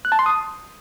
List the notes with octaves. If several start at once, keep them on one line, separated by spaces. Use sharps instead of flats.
F#6
A5
C6
D#6